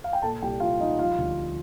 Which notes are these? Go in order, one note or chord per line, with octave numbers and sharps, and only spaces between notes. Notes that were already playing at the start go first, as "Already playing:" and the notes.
F5
G5
A#2 A4 A5
C2 G4 G5
C2 F4 F5
C2 D#4 D#5
F3 F4 F5
D2